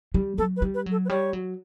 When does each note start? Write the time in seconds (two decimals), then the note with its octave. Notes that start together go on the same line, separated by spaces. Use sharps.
0.14 G3
0.38 F#3 A4
0.57 B4
0.62 G3
0.74 B4
0.86 F#3
0.91 A4
1.05 B4
1.09 G3 C#5
1.33 F#3